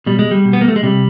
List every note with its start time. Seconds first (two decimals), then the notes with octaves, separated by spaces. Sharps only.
0.06 B2 G3
0.19 G#3
0.31 G3
0.45 B2
0.53 B3
0.61 A#3
0.68 A3
0.76 G#3
0.83 C3 G3